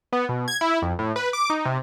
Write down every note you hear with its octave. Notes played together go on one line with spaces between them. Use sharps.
B3
B2
G#6
E4
F2
A2
B4
D6
D#4
C3